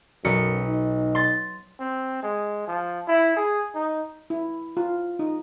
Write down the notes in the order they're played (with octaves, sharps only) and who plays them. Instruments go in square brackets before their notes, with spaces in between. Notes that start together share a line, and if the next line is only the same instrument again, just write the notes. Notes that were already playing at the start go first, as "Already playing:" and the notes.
[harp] B1 C#7 [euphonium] F#2
[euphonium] D#4
[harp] C6 A6
[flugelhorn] C4
G#3
F3
E4
G#4
D#4
[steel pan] E4
F4
D#4